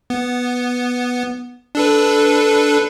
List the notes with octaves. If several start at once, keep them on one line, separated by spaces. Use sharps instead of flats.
B3
D4 A4 B4